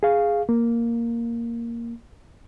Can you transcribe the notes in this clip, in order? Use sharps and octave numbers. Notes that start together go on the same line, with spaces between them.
G#4 F5
A#3